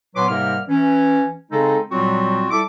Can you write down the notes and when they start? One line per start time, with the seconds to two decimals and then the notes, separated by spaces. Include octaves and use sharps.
0.15 A#2 F#3 B3 B4 C6 D6
0.29 G#2 C3 G3 A#3 A#4 F6
0.69 E3 C#4
1.51 C#3 G#3 C4 D#4 A4
1.91 A#2 F#3 G3 C4 F4 F#4
2.50 G3 E4 A4 D6